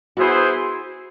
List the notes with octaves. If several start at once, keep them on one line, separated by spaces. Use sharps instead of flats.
B3 E4 F#4 G#4 C5